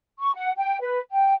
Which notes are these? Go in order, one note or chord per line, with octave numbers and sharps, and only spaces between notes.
C#6
F#5
G5
B4
G5